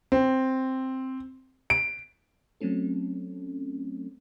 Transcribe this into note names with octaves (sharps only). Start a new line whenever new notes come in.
C4
D7
F#3 A3 C4 C#4 A4